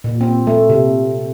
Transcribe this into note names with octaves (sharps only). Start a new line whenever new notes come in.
A#2
C4
A3
C3